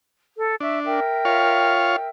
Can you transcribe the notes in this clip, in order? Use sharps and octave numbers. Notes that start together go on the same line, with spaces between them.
A4
D4 E5 C#6
A#4 E5 G5
F4 C#5 F5